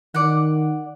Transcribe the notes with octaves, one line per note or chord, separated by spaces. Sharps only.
D#3 D5 F#5